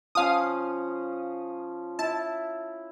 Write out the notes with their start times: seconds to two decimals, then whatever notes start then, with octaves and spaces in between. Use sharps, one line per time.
0.15 F3 C#4 F5 D#6
1.99 E4 A5